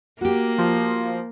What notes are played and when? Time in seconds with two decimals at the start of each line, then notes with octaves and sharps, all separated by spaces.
0.21 A#3 F#4 G4
0.58 F3